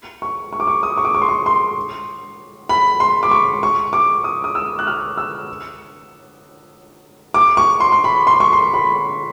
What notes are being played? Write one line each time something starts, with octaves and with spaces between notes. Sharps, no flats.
C#6
C#6
D6
C#6
D#6
D6
C#6
D6
C#6
C6
C#6
C6
B5
C6
D6
C#6
C#6
D6
D#6
D#6
E6
F#6
F6
E6
D6
C#6
C6
C6
B5
C6
C#6
C6
B5